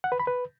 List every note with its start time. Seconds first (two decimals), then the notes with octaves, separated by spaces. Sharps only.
0.04 F#5
0.12 B4
0.20 B5
0.27 B4